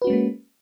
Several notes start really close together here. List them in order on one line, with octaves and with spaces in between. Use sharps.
B4 F#4 C#4 G#3 A#3